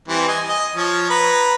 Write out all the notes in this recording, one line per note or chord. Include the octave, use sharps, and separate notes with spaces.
E3 G3 C4
D#5 G#5
D#5
F3 C#5
B4 A#5